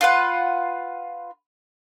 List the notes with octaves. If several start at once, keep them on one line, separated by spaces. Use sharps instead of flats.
F4 B4 F#5